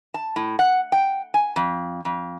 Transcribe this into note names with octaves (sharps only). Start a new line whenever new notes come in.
A5
A2
F#5
G5
G#5
F2
F2